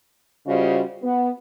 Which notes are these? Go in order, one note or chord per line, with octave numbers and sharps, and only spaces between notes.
C#3 G3 F4 F#4 C5 D#5
B3